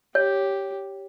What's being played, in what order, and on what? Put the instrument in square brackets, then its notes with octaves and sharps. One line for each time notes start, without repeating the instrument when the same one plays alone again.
[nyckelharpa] G4 [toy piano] C#5